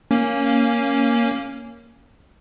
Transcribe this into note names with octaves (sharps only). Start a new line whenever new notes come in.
A#3 C#4